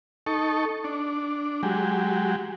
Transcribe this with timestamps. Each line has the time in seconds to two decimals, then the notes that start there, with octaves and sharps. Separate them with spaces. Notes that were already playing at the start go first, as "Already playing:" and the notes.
0.27 D#4 A4 C#6
0.84 D4
1.63 F#3 G#3 G4